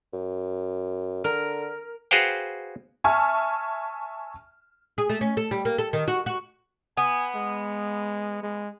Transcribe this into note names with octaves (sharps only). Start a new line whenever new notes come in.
F#2
D3 A#4
F#4 G#4 B4 C5 F5 G5
E5 G#5 A5 C#6 F6
G#4
A3
C#4
A4
G3
A#3
A4
D#3
F#4
F#4
B3 G#5
G#3
G#3